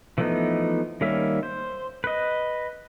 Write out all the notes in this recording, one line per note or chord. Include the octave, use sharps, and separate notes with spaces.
E3 F3 A3 B3 D#4
D#3 G3 A#3 C#4 E5
C5
B4 D#5